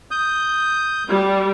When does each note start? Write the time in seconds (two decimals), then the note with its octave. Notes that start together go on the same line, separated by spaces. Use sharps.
0.11 D#6 G6
1.09 G3